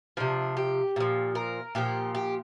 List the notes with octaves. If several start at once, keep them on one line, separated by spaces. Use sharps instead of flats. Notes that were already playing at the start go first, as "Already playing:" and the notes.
C3 F3 D4
G4
A#2 F3
A#4
A#2 F3 G4
G4